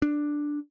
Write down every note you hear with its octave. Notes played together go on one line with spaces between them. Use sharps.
D4